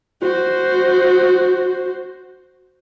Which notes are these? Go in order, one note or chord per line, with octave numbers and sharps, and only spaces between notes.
F#4 C5